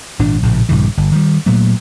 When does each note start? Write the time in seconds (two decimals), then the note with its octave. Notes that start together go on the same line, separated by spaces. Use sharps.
0.19 G#1 A#2 D4
0.43 A#1 A2 C#3
0.69 A#1 G2 C#3 E3
0.97 G1
1.12 D#3 E3 G3
1.46 A#2 F#3 A3